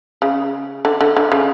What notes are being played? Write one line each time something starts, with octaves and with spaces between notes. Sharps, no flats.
C#3
D3
D3
D3
C#3